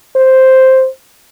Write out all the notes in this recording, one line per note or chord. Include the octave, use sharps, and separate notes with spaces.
C5